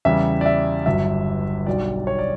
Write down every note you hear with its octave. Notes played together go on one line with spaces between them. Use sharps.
E2 C#3 G3 E5
D5
E5
G1 G2 F#3 E5
B1 B2 G3 D5
C#5
D5